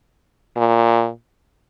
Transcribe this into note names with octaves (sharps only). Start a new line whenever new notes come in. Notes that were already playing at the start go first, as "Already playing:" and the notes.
A#2